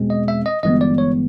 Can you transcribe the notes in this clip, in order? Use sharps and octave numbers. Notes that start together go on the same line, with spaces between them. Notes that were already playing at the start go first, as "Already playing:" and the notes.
Already playing: E2 B2 G#3 C4
D#5
E5
D#5
G1 G2 E3 G#3 B3 D#5
D5
C#5